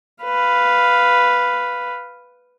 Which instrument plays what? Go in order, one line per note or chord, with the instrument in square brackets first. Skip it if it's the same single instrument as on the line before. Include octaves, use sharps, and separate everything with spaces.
[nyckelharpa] B4 F5